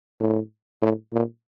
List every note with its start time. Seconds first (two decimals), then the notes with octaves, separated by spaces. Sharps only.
0.20 A2
0.82 A2
1.13 A#2